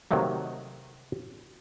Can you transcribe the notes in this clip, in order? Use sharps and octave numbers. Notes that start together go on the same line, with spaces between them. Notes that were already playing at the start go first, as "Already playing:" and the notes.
C3 D#3 F#3 A3 A#3